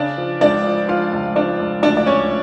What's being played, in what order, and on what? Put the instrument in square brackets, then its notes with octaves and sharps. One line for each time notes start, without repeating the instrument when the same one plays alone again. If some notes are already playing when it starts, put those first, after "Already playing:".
Already playing: [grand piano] C#3 D4 D5
F3
C#2 D4 D5
F3
F3 F4 F5
C#2
F3 D4 D5
C#2
D2 D4 D5
D5
D2 C#4 C#5